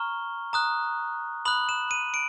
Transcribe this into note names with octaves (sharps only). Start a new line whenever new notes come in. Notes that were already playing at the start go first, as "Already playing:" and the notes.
Already playing: A#5 C#6 F6 G7
A#5 D#6 F#6
B5 D#6 F#6 F#7
E7
D#7
D7